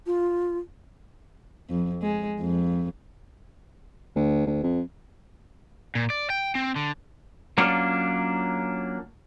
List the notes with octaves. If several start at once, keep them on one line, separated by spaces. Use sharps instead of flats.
F4
F2
G#3
F2
D2
D2
F2
A#2
D5
G5
C4
D3
F#3 A#3 C#4 D4 F4